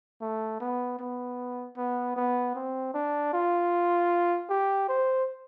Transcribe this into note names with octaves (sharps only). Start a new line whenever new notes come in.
A3
B3
B3
B3
B3
C4
D4
F4
G4
C5